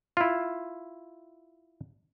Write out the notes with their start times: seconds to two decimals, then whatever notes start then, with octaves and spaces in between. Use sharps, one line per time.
0.17 E4 F4